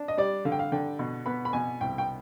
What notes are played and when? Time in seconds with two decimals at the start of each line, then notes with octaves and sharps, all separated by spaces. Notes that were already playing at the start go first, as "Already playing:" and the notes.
Already playing: D4
0.08 D#5
0.17 G3 D5
0.45 D3 F5
0.52 G5
0.59 F5
0.72 D3 G5
0.99 B2
1.26 B3 B5
1.45 B5
1.53 B2 G#5
1.81 C2 G5
1.98 G5